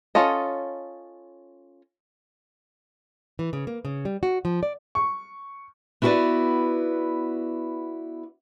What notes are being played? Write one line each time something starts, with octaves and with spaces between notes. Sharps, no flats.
C#4 F4 A4 D#5
E3
C#3
A#3
C#3
G3
F#4
F3
D5
C#6
B3 E4 F#4 G4 B4 D5